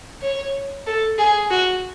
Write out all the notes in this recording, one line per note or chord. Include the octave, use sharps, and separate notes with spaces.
C#5
A4
G#4
F#4